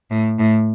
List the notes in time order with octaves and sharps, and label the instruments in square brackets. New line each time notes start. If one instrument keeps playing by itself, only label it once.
[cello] A2
A2